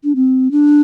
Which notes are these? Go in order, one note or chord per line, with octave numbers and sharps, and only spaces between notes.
D4
C4
D4